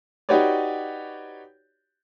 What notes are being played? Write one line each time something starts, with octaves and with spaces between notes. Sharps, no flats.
D#4 F#4 G4 B4 C#5 D5